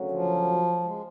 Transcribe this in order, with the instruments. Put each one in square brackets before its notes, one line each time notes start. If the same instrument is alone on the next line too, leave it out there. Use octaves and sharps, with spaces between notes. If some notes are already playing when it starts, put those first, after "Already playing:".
Already playing: [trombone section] D2 C#3 F#3 C#4
[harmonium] F3
G#3